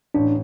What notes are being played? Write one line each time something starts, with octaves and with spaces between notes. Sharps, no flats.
A1 D4